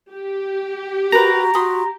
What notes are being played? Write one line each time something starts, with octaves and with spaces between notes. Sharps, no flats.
G4
F#4 A#4 B4 A#5
F#4 B5 C6 D#6